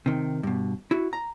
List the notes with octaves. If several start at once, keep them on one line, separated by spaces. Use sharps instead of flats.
C3 D#3
G2 B2
E4 F#4
A#5